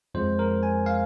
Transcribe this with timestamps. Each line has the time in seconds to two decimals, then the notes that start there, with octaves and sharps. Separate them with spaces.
0.14 F2 F3 G#3 C5
0.39 A#4
0.63 G#5
0.86 F5